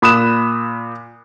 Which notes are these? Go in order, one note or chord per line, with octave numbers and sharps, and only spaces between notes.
A#2 B5 D#6 F#6 E7